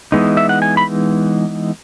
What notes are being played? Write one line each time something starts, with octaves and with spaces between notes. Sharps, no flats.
E3 G#3 B3 D#4
E5
F#5
G#5
B5